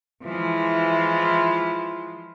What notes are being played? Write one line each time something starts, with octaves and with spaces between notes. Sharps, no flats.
E3 F3 G#3 E4 F4